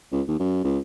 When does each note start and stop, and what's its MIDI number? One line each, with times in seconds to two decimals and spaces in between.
0.12 0.22 37
0.28 0.36 39
0.39 0.63 42
0.64 0.79 37